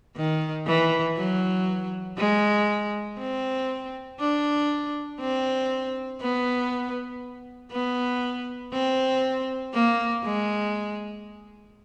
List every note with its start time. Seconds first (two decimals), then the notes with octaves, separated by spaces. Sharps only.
0.17 D#3
0.67 E3
1.17 F#3
2.18 G#3
3.19 C4
4.20 D4
5.20 C4
6.21 B3
7.72 B3
8.73 C4
9.74 A#3
10.24 G#3